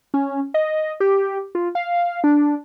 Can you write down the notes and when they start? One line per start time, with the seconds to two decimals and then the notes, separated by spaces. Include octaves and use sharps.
0.14 C#4
0.54 D#5
1.00 G4
1.55 F4
1.75 F5
2.24 D4